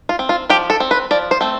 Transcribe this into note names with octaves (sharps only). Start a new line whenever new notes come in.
F4
C4
F4
F3 G4
A4
C4
B4
F3 D5
C5
A3 C4